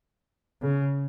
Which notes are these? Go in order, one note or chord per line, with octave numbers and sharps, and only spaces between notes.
C#3